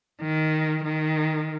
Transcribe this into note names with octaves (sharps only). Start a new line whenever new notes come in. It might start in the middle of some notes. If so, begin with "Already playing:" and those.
D#3
D#3